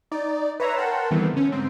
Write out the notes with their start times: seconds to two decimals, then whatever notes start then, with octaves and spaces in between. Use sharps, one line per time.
0.12 D#4 D5
0.60 B4 C#5 E5 A#5 C6
0.75 A#4 F#5 G5 A5 C6
1.11 D#3 E3 G3 A3 B3 C4
1.33 D3 C#4
1.52 G#2 C4